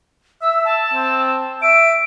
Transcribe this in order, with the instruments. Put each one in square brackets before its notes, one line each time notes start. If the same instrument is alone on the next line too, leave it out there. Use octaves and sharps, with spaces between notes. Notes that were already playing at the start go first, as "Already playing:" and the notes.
[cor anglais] E5 [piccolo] E6
[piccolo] A5
[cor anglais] C4
[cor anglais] E5 [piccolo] D7